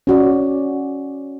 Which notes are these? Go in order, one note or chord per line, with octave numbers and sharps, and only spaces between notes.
C#4 F#4 D5